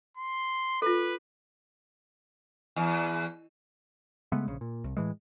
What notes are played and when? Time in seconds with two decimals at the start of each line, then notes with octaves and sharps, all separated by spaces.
0.17 C6
0.82 F4 A4 B4
2.76 E2
4.32 C#3 G#3 A3 B3
4.48 A#1 C#3
4.61 A#2
4.84 C2
4.97 A2 E3 G#3